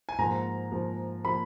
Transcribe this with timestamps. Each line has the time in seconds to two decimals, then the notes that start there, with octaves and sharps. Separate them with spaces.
0.09 G#5
0.18 G#2 F3 A#3 A#5
0.72 G#2 F3 A#3
1.25 F3 A#3 B5